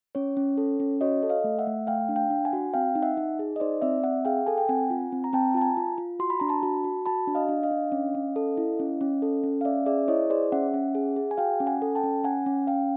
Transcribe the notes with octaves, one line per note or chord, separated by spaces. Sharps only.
C#4 C#5
C#4
A4
C#4
F#4 C#5 D#5
A4
D#5 F5
A3
E5 F#5
A3
A3 F5 G5
D4
F5 G5
D4
F#5 G#5
F#4
C4 F5 G5
D#4
E5 F#5
D#4
G#4
D#5
D#4 C5 D5
C4 D5 E5
C4 E5 F#5
G#4 F5 G5
A4 G#5
G5
C4 F#5 G#5
F4
C4
A#5
C4 G5 A5
F4 A5
G#5 A#5
F4
F4
F#4 C6
B5
D4 A#5
A5 B5
F#4
F#4
F#4 A5 B5
D4
D#5 F5
D4
D#5 F5
D4
C#4
C#4
A4
E4
C#4
C#4
A4
C#4
F5
C#4 D5 E5
G#4 D5 E5
E4 C#5 D#5
G#4 C5 D5
C#4 E5 F#5
C#4
G#4
G#4
G#5
F#4 F5 G5
C#4
F#5 G#5
A4
G5 A5
C#4
C#4 F#5 G#5
C#4
C#4 F5 G5